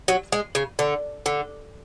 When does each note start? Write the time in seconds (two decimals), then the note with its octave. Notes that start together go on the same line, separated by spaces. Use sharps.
0.08 F#3
0.32 G#3
0.55 C#3
0.79 D3
1.26 D3